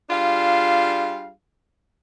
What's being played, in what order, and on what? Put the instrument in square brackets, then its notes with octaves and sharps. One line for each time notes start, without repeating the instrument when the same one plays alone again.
[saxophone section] G3 D4 F4 G#4 F5